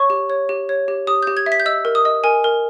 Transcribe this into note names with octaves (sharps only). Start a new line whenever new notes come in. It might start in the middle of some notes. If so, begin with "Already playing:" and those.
Already playing: C#5 C#6
G4
C#5
G4
C#5
G4
G4 D#6
G4 G6
G#6
E5
B6
G6
D#5 E6
A#4
D#6
D#5
A#4 G#5
A#4